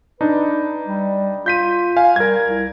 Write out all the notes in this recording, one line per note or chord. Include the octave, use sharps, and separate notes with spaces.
D4 D#4 B4
G3
F4 G6 B6 D#7
F5 G#5
G3 A#4 G#6
C2